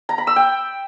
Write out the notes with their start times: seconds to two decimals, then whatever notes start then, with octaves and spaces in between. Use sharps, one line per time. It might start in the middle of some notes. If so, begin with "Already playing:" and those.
0.09 A#5
0.18 B5
0.27 E6
0.36 G5